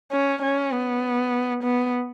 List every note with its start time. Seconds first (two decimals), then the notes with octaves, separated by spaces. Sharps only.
0.12 C#4
0.42 C#4
0.71 B3
1.63 B3